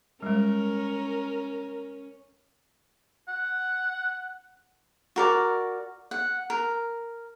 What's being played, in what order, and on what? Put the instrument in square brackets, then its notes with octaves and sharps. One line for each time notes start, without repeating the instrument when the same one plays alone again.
[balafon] G3 G#3 [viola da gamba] C#4 [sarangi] A#4
[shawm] F#5
[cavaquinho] F#4 A#4 D5
F#5
A#4